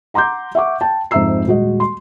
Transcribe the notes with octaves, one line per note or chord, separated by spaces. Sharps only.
F#5 A#5 C6 D6 G6
E5 F#5 C#6 D6
G5 A5
F2 G#2 E5 A#5 E6 C7
D#1 G#3 F#4 D#5
C6